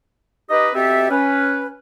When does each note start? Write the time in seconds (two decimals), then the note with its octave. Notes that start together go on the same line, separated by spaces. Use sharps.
0.50 D#4 G4 B4 D#5
0.74 B2 C4 G4 A4 E5
1.10 C#4 B4